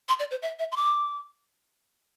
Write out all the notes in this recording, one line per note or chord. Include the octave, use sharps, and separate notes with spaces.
C6
D5
C5
E5
E5
C6
D6